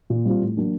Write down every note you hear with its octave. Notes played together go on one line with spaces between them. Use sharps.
A#2
G3 C4 F4
A2
F#3 A#3 D4